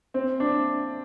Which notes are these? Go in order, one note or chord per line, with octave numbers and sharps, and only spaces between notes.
C4
D4